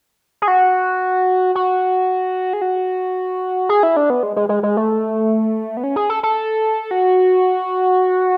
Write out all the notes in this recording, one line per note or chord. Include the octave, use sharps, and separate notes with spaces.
G#4
F#4
F#4
G#4
F#4
G#4
E4
D4
B3
G#3
G#3
G#3
G#3
A3
B3
C#4
G#4
A4
A4
F#4